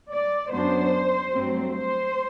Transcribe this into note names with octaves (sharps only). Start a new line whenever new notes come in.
D5
F#2 F#3 B3 D4 C5
G2 F#3 A3 C4
C5